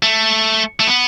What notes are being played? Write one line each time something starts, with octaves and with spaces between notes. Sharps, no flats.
A3
A3
B3